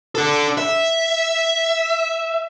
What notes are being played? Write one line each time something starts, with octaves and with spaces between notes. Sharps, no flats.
D4 A4
E5